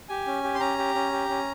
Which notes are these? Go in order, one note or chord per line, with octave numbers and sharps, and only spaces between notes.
G4 G#5
C#4
G4
C6
C#4 A#5
G4
C#4
G4
C#4